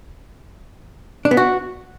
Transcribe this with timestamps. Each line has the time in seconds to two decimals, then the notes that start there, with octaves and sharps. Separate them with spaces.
1.25 D4
1.31 B3
1.37 F#4